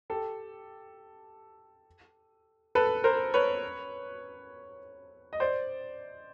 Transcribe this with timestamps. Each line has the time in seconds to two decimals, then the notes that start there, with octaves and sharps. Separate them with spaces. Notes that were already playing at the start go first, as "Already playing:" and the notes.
0.10 G4 A4
2.75 A4 B4
3.04 A#4 C5
3.34 B4 C#5
5.33 D#5
5.40 C5 D5